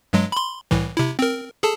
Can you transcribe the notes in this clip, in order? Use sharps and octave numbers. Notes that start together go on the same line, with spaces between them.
G2 F#3 G#3
B5 C6
C2 A2 E3
C3 E4
C4 A#4
G#4 A4 A5